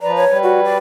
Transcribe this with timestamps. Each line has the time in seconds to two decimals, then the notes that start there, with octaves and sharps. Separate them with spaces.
0.01 F3 B4 D5 A#5
0.16 C#5
0.29 G3 B4
0.43 F#4
0.65 D5